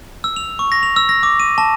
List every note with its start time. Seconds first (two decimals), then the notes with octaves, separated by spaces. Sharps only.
0.24 E6
0.36 F7
0.59 C#6
0.72 A#6
0.83 F7
0.96 E6
1.09 A#6
1.23 D6
1.40 D#7
1.58 A5